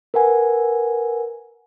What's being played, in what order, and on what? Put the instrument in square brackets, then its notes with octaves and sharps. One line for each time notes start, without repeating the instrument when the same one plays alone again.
[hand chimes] A#4 B4 F#5 G#5